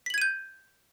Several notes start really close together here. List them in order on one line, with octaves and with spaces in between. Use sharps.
B6 F#7 G#6 D#7 G6